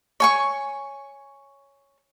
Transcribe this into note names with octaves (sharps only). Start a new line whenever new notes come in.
C#5 G#5 C#6